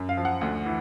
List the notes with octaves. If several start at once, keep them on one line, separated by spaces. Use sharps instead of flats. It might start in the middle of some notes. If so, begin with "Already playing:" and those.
Already playing: F#2
F5
F3
F#5
D2
E3